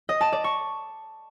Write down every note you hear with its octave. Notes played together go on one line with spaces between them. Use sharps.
D#5
A5
D5
C#6